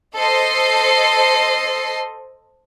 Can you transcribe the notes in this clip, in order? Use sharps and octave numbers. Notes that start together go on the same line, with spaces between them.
A4 C5 D#5 C7